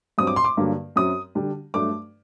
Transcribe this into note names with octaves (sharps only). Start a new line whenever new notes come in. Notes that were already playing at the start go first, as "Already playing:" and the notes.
G2 F#3 C4 D#6
D6
C6
D6
G2 D3 F#3 A#3
F#2 F#3 C4 D#6
D3 G3 D4
G2 F#3 A3 D4 D6